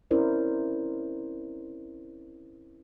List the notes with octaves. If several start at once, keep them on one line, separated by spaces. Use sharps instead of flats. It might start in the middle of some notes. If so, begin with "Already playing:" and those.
C4 C#4 E4 A#4 C5 D5